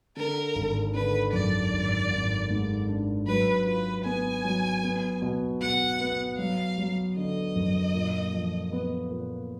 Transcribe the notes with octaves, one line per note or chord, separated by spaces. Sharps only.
D3 A#4
G#1
D3 B4
F#2 D5
G#1
G#1
G#2
D4
F#3 B4
F4 B4
B3 G#5
F#3
B3
B2
B2 F#5
B3
F#3 F5
F#3
D3 D#5
F#2
A#2
F3
B3
A#2